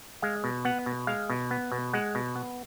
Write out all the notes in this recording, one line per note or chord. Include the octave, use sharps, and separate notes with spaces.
G#3 F5
B2
B3 F#5
B2
G#3 F5
B2
B3
B2
G#3 F#5
B2
B3